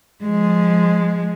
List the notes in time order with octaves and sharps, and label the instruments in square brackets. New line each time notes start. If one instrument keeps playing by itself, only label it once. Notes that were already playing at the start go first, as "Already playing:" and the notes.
[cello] F3 G#3